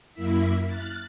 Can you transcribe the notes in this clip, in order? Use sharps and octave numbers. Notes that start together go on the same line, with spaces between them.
F#2 A#3 E4 E5 B6
F6 F#6 A6